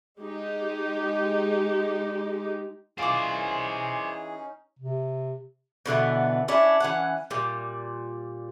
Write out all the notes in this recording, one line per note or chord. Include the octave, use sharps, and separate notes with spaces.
G#3 D#4 G4
E3 C#4 D#4 F4 G#4 C5 D5 D6
C3
B2 D3 E3 B3
C#4 D4 E4
E3 C#4 F#5
A#2 G3